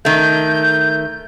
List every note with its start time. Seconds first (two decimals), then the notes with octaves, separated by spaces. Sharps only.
0.05 D#3 A3 G6